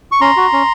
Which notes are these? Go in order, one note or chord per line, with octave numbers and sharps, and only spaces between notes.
C#6
C#4 A#5 C6
F#4
C#4